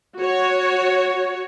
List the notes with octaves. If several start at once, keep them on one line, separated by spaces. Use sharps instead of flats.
F#4 C#5